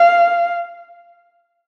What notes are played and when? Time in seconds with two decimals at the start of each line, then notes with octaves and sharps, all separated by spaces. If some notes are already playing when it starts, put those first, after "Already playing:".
Already playing: F5